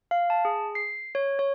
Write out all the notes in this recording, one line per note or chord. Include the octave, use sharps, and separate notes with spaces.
F5
A5
G#4
C7
C#5
C#5